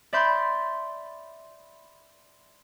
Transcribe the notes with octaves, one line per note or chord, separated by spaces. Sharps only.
D5 E5 B5 C6 G6